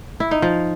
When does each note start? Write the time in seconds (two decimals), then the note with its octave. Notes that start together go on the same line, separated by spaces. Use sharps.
0.20 E4
0.31 D#4
0.42 F3